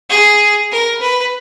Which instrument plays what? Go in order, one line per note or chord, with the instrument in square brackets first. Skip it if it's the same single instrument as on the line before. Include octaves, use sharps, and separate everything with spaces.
[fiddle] G#4
A#4
B4